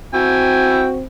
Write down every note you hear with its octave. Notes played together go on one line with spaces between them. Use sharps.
C4 E4 F#4 G5 G#5